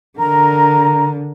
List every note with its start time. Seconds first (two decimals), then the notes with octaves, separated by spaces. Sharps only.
0.19 D3 A#4 A#5